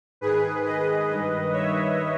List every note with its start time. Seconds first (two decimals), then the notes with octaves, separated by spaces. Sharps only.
0.21 G#2 D#3 G#4 B4
0.65 B4 D#5
1.09 G2 D#3
1.53 C#5 E5